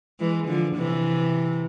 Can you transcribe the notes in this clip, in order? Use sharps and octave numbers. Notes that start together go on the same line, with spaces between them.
E3 G#3
D3 F3
C3 E3